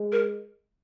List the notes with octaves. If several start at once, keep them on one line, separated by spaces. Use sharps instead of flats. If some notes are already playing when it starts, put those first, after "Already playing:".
Already playing: G#3
A#4